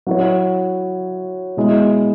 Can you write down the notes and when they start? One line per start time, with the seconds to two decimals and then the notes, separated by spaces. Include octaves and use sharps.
0.07 F#3 E4 C#5
1.57 B2 G#3 E4